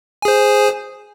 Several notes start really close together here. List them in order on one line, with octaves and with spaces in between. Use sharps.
G#5 G#4 C5